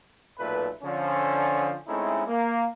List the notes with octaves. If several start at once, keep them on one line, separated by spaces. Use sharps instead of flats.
B1 A#2 A3 B4
D3 F3 C#4
G#3 A3 C4 C#4 D#4 E4
A#3